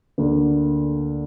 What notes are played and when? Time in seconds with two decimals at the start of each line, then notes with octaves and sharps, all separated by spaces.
0.18 D2 D3 A#3